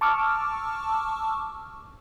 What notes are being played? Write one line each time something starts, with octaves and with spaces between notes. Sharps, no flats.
A5 C#6 D6 E6 F6